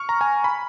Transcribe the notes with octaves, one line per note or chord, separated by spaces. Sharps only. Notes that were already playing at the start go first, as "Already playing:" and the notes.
Already playing: C#6 F6
A#5
G#5
B5